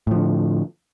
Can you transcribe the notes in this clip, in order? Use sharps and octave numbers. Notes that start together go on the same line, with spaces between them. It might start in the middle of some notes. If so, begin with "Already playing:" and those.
A2 D3 F3